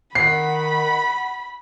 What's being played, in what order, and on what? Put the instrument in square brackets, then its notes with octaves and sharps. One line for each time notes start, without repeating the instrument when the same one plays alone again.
[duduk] D#3 [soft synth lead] F#5 [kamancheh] B5 [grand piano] C7